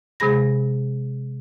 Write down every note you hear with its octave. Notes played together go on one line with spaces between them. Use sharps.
C3 G#3 G#4 B5 A#6